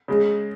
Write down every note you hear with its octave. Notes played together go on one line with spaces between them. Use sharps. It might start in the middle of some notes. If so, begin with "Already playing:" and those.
C#3 G#3